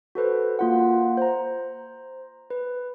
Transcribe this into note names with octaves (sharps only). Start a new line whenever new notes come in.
F#4 A4 B4 C5
A#3 F4 F#5
C5 A#5
B4